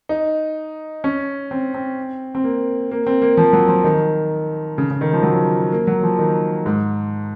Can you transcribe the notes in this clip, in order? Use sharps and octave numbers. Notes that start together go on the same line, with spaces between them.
D#4
C#4
C4
C4
C4
A#3
A#3
C4
A#3
F3
F#3
F3
D#3
C#3
C#3
D#3
F3
F#3
F3
A#3
F#3
F3
D#3
G#2